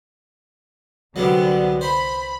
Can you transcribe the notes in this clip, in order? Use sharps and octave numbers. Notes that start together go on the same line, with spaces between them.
C2 D3 F#3 G3 B3
C5 B5